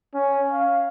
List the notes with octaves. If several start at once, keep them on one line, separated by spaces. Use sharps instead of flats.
C#4
F5